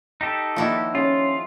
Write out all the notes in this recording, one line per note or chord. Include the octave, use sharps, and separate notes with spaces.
D#4 G4 A4
D#3 F3 A#3 D4 E4 F#4
C#4 F4 G#4